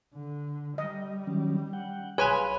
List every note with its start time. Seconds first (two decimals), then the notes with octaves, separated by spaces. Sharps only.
0.14 D3
0.78 G3 D#5
1.27 D#3 F#3 C#4
1.73 F#5 G5
2.18 B1 G#4 B4 C#5 F5 G#5 B5 C6